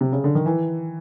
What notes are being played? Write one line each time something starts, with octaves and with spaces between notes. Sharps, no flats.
C3
C#3
D3
D#3
E3